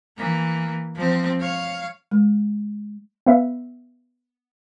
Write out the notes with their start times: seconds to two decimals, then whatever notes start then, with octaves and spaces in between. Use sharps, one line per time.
0.17 E3 A#3
0.95 F3 C4
1.40 C#5 F5
2.11 G#3
3.27 B3 B4 E5 F5